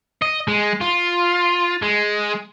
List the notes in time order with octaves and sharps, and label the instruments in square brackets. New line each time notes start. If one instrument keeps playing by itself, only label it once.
[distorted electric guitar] D#5
G#3
F4
G#3